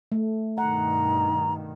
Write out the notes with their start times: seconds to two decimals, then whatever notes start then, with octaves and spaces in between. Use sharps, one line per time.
0.12 A3
0.58 G2 B2 D#3 F#5 A#5